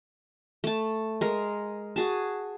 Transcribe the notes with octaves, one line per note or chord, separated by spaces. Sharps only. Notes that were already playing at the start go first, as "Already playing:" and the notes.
A3 A5
G#3 A#4
F#4 G#4 A5